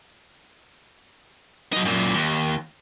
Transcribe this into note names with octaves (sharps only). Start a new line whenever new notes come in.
F#3 D#4
F#2 A#2
D#2